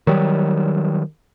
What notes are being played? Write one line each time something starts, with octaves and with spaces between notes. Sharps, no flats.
D#3 F#3 G3